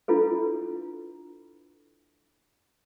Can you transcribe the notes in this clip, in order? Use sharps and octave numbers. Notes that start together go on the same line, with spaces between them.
D4 E4 F4 A4 B4